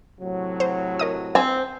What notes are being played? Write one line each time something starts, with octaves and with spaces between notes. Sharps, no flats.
A2 C3 F#3
C5
A#4 D#5 D#6
C4 G#5 E6